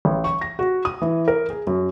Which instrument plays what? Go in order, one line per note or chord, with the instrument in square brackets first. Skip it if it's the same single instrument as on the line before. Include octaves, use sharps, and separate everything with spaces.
[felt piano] A1
C#6
A#6
F#4
D#6
E3
A#4
G#4
F#2